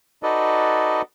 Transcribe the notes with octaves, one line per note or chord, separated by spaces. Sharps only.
D#4 F#4 A4 B4 D5 D#5